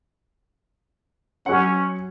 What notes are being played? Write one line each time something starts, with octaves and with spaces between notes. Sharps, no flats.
F#3 C#4 F#5